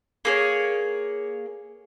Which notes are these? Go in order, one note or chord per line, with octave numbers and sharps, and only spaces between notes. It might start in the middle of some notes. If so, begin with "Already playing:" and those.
A#3 G#4 C#5